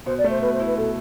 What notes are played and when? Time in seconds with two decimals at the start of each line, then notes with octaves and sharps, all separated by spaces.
0.06 B2 C5
0.18 D5
0.24 A3
0.30 C5
0.41 B2 B4
0.53 C5
0.60 E4
0.66 B4
0.77 B2 A4